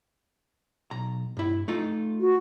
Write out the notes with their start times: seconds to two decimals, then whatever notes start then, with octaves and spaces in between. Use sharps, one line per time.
0.91 B1 A#5
1.37 G2 E4
1.68 A3 D#4 F4
2.21 F#4